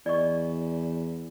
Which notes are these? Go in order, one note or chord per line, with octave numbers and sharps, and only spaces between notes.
E2 D5 D#5 C#6